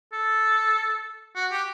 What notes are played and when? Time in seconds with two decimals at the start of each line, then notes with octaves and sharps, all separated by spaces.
0.13 A4
1.35 F#4
1.51 G4